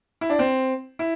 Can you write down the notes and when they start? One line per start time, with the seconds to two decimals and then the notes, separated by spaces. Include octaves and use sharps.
0.21 E4
0.30 D4
0.39 C4
0.99 E4